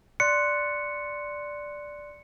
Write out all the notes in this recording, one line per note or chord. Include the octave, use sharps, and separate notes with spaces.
D5 C6 F#6 C#7